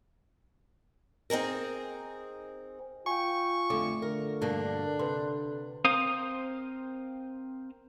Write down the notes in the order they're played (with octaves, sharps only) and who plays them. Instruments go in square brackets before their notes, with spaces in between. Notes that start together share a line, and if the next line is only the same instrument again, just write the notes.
[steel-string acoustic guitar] C4 D#4 G#4 A#4
[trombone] F4 [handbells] G5 G#5 [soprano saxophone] C#6
[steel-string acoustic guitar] F2 D3 [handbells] A3 D6
[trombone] D3 [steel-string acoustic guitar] A#4
[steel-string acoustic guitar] G2 B2 A#3 [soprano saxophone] D4
[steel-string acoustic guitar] C3 [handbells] B4 C6
[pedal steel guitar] C4 A#4 C5 F5 D#6